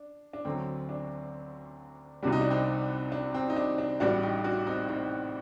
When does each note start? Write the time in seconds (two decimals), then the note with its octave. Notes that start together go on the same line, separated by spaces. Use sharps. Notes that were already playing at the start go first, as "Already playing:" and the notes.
Already playing: D4
0.33 D4
0.45 D2 D3 F#3 C4
0.89 D4
2.23 C2 C3 G3 F#4
2.32 D#4
2.41 D4
2.50 C4 D#4
3.12 D4
3.34 C4
3.50 D#4
3.56 D4
3.78 D4
4.00 A1 A2 G3 D4 F#4
4.23 D#4 G4
4.44 D4 F#4
4.67 C4 D#4
4.89 C4 D#4